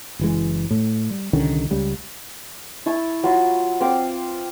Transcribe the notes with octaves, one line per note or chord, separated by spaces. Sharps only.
F#1 E3 G#3
A2
G3
C2 D3 D#3 C#4
C#2 C#3 G3
E4 A5 C#6
F#3 F4 B5
C4 F5 D6